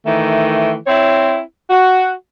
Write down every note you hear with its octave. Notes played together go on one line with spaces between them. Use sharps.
D#3 E3 A3
C4 E4 C#5
F#4